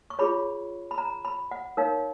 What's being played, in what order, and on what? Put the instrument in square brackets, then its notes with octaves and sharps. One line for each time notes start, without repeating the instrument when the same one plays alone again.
[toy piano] C#6
F4 G#4 C#5 B5
B5
A#5
B5
F#5
D#4 A#4 C#5 F5